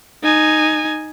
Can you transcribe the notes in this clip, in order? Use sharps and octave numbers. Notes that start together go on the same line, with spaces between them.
D#4 G#5